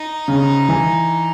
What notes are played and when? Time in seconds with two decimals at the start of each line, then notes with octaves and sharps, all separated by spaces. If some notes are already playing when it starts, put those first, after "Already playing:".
Already playing: D#4
0.28 C#3
0.69 E3